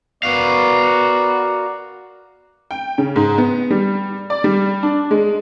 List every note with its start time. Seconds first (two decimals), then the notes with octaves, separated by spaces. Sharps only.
0.23 B3 F#4 A#4 D5 F5
2.71 G5
2.98 C#3
3.16 G#2
3.38 B3
3.70 G3
4.30 D5
4.44 G3
4.83 D4
5.11 G#3